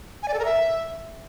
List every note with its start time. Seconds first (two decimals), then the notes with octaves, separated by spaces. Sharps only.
0.23 G#5
0.28 D5
0.34 A4
0.39 A#4
0.45 E5